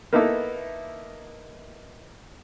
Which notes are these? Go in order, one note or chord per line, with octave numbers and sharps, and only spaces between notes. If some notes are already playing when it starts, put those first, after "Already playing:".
A#3 B3 D#4 E4 A4 E5